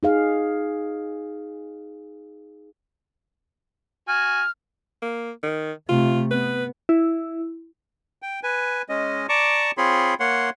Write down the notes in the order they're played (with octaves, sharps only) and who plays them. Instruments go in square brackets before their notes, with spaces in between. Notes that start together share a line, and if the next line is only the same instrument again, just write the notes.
[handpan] D#4 G#4 F5
[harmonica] F#4 G#5 [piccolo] F6
[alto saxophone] A#3
D#3
[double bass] C3 A3 [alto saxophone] F4
[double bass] B3 [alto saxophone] B4
[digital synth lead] E4
[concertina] G5
B4 G#5
G#3 C#4 D#5
D5 A5 A#5 C#6 D6
C4 F4 G#4 C#5 B5 C6
A#3 C#5 F#5 C6